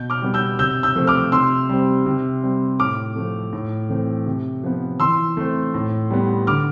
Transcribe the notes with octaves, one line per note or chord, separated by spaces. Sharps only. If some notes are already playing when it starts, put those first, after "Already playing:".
Already playing: B2 G6
D6 F6
G3 B3
E6 G6
C3 E6 G6
E6 G6
F3 A3 C4
D6 F6
C3 C6 E6
G3 C4
C3
G3 C4
A2 D6 F6
F3 A3
A2
E3 A3 C4
C3
F3 B3
E3 C6 E6
A3 C4
A2
G3 B3
D3 D6 F6